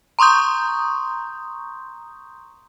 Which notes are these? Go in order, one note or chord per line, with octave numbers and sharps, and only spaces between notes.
A#5 C6 C#6 D#6 G6